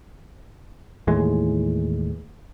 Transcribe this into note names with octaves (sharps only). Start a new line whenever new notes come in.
D#2 A2 E3 G#3